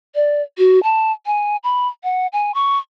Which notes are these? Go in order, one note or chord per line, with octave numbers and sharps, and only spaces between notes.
D5
F#4
A5
G#5
B5
F#5
G#5
C#6